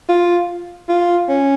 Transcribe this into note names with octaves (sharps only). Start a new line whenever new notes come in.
F4
F4
C#4